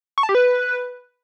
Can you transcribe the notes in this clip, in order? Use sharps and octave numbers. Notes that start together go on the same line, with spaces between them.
C#6
A5
G4
B4